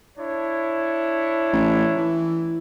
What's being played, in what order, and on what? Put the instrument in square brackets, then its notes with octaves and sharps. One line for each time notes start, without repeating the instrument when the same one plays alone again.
[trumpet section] D4 E4 C#5
[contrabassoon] A1
E3